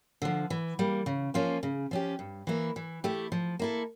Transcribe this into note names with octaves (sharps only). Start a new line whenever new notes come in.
D3 F3
E3
G3 A#3
C#3
F3 A#3 C#4 F4
C#3
F3 C#4 G4
G2
E3 A#3 E4
E3
A3 E4 G4
F3
A#3 E4 A4